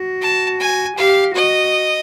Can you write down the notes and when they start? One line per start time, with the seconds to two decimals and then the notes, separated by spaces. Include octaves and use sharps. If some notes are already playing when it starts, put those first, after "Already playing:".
Already playing: F#4
0.21 A5
0.59 G#5
0.97 G4 F5
1.35 F#4 D#5